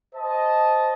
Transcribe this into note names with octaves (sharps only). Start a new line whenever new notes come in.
C5 D#5 A5